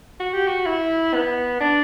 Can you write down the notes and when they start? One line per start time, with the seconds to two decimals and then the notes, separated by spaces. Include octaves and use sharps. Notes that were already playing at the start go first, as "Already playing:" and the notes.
0.20 F#4
0.33 G4
0.47 F#4
0.66 E4
1.14 B3
1.60 D4